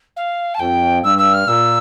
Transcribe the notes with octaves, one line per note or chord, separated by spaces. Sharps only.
F5
A5
F2 G5
G2 E6
E6
F6
A#2 E6